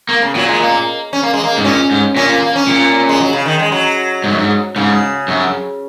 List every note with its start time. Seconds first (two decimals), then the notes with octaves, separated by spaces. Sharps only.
0.09 A#3
0.22 C#3
0.35 A#2 F#3
0.48 G#3
0.60 A#3
1.13 C#4
1.23 A#3
1.34 G#3
1.44 A#3
1.58 G#2
1.65 A#2 C#4
1.91 G#2
2.16 A#2 C#4
2.29 A#3
2.42 A#3
2.56 C#4
2.68 A#2
3.09 G#3
3.21 F#3
3.33 C#3
3.46 D#3
3.59 G#3
3.72 F#3
4.24 G#2
4.32 F#2
4.39 G#2
4.76 G#2 C#3
5.28 F#2